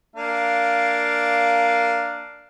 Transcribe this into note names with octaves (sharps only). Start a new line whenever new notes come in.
A#3 D4 F5